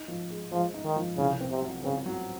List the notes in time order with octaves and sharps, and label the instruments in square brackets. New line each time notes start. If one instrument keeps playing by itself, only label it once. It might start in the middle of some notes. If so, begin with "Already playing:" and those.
Already playing: [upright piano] D#4
F3
G#3
[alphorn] F3 [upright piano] G#3
[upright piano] D#4
[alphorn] D#3
[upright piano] F3
[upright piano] C2 [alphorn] C#3
[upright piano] C4
[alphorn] C3
[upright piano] F#3
[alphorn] C#3 [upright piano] C4
[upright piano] F#3